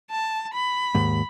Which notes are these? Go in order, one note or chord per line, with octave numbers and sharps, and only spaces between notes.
A5
B5
D#2 G#2